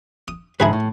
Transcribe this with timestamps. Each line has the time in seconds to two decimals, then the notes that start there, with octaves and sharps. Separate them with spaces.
0.28 D#6
0.60 G#2 D3 E4 G#4 B4 B5
0.73 A2